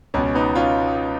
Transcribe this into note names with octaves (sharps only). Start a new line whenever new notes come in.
C#2 B2 C#4
B3 D#4
C#4 F4